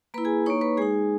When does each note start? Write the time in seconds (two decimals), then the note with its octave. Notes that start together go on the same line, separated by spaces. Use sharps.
0.14 A#3 E4 B4 B5
0.25 G#4 G#5
0.46 A#3 D#4 C#5 C#6
0.61 B4 B5
0.77 G#3 D#4 G#4 G#5